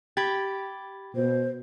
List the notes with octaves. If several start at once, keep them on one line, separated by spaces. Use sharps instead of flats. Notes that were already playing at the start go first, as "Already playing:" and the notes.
G4 B5 G#6 A6
B2 C5